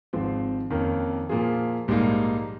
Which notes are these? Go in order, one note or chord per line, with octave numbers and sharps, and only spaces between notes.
G#1 G#2 F3 C4
F2 D#3 A#3 C#4
A#2 F3 A#3 F4 G#4
A#1 G#2 G3 A#3 D#4